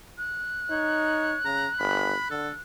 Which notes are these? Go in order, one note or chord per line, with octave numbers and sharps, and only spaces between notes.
F#6
D#4 C#5
C#3 A#5
G1 B5
D3 A4